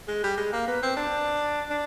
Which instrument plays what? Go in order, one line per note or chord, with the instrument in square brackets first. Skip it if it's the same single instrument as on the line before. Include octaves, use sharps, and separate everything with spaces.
[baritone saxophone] G#3
G3
G#3
A#3
B3
C4
D4
D4